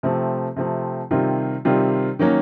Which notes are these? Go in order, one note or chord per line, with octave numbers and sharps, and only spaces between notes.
C3 F3 A3 C4
C3 F3 A3 C4
C3 D#3 G3 C4 F4
C3 D#3 G3 C4 F4
D#3 F#3 A#3 C#4